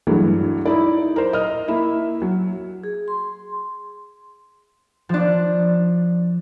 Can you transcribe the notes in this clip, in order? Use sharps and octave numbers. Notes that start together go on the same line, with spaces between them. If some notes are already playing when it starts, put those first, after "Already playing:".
G2 E3 F#3 G#3 A3
D#4 E4 D5
A#4 C5
D#5 F6
A#3 E4 E5
F#3
G#4
C6
F3 D4